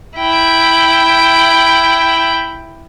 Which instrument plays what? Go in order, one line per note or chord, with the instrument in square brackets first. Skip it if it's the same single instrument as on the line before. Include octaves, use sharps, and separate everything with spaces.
[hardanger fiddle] E4 G5